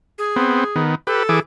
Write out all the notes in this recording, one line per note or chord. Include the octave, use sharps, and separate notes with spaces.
G#4
B3 C4
D#3 B3
G4 A4 B4
E3 G#4 D6